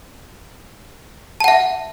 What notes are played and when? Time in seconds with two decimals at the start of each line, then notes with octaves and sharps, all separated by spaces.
1.40 A5
1.44 F#5
1.48 E5